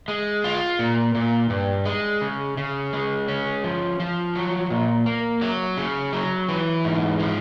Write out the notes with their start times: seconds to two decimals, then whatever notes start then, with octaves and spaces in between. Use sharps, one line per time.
0.08 G#3
0.44 F4
0.79 A#2
1.15 A#2
1.50 G2
1.85 G#3
2.22 C#3
2.57 C#3
2.93 G#3
3.28 C#4
3.64 F3
4.00 F3
4.35 F#3
4.70 A#2
5.06 A#3
5.41 F#3
5.77 C#3
6.13 F#3
6.49 E3
6.84 G#2
7.20 F3